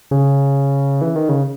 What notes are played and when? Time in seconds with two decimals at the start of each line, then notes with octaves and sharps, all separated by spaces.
0.11 C#3
1.01 E3
1.16 D#3
1.29 C#3